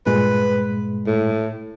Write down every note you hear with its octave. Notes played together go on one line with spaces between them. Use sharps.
G2 A#2 G#3 B4
A2